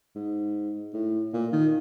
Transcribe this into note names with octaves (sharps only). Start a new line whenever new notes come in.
G#2
A2
A#2
D#3